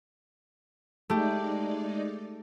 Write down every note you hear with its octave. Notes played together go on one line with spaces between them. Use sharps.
G#3 A3 D#4 G4 D5